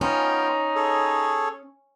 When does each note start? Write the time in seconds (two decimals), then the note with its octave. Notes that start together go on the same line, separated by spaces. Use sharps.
0.01 B3 C#4 D#4 F4 G5
0.75 G#4 A4 C#5